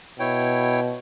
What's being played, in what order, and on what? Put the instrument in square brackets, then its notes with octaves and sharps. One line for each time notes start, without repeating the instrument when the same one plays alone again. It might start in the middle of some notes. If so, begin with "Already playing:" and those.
[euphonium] B2 [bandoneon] E4 C#5 G5